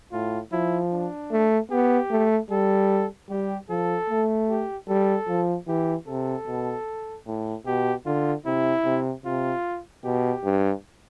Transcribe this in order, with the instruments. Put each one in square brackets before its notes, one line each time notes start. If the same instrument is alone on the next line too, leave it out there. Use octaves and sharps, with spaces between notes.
[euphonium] A2 [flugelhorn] F4
[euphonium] F3 [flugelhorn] E4
[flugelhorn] D4
[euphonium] A3
[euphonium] B3 [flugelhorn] G4
[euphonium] A3
[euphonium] G3 [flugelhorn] A4
[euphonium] G3 [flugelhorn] G4
[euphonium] F3 [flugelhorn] A4
[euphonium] A3
[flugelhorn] G4
[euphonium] G3 [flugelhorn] A4
[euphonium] F3
[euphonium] E3 [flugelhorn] G4
[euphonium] C3 [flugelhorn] A4
[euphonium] B2
A2
[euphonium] B2 [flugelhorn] G4
[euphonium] D3 [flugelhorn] F4
[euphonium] C3 [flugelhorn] E4
[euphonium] C3
[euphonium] C3 [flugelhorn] F4
[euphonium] B2 [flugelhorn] G4
[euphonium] G2